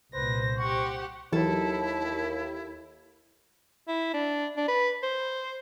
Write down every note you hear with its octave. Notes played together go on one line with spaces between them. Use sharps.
C2 A#2 B4 C5 A#6
G4 F#5 C#6
D#2 E3 F#3 E4 A4
E4
D4
D4
B4
C5